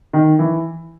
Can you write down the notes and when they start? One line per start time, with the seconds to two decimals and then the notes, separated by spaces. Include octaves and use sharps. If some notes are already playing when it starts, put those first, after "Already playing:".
0.13 D#3
0.39 E3